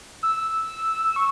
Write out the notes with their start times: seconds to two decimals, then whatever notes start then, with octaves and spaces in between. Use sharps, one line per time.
0.23 E6
1.16 C#6